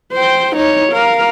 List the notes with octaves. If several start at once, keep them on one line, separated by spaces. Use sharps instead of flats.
C5 G5
D#4 C#5
A#4 F5